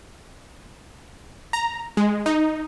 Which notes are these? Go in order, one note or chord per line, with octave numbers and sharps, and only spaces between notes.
A#5
G#3
D#4